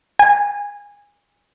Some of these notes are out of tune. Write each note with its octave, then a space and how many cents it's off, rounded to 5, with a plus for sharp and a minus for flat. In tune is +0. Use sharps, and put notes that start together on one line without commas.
G#5 -25